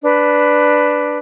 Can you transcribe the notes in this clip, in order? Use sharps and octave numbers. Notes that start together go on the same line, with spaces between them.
D4 B4